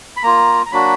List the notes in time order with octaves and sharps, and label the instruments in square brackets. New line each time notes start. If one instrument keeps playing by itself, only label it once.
[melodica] B5
A#3 F4 A#5
A#5
F#3 A#3 D4 F#4 B5